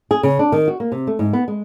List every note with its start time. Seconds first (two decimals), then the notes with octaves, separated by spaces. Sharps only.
0.11 G#4
0.23 C#3
0.39 D4
0.52 D#3
0.68 F#4
0.80 A#3
0.92 C3
1.07 A3
1.19 G#2
1.33 B3
1.48 G#3